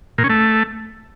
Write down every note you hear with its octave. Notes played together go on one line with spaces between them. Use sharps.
A#2
C#4
A3